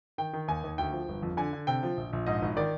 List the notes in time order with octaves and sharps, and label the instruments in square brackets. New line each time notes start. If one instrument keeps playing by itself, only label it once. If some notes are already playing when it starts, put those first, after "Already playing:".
[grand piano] D#3 G5
D#3
D#2 G#5
D#2
D2 G5
F3
G1
F2
D3 G#5
D3
C3 G5
F3
A#1
A#1
G#2 D#5
G#1
D#3 D5